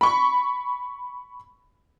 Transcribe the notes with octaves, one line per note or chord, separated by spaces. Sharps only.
B5 C#6